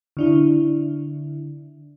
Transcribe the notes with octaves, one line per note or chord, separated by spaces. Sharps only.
D3 D4 E4